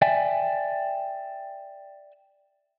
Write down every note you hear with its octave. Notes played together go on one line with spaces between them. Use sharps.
D5 E5 G5 G#5